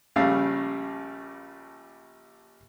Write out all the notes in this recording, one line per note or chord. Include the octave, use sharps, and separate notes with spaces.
A#1 C#3 G3 A3 F5